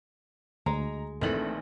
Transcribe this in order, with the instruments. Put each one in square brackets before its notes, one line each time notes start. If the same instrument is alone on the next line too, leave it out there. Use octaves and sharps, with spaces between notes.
[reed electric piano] D2 [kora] G#3 [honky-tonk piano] A#5
[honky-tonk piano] A#1 C4 F#7 [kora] D#3 E3 A4 [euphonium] A3